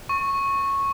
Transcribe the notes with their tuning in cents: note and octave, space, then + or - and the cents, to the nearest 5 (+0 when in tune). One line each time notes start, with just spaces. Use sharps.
C#6 -10